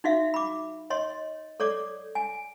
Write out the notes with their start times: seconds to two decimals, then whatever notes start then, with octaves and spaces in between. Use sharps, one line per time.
0.04 D#4 F#4 E5 F5
0.34 B5 D6
0.90 C#5 D#5 C6
1.60 A4 C#5 D5 D6
2.15 G#5